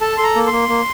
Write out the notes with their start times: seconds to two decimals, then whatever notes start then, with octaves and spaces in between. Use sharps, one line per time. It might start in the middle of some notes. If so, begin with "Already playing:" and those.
0.01 A4 A5
0.17 A4 C6
0.23 A#5
0.35 A#3
0.47 A#3 C6
0.69 A#3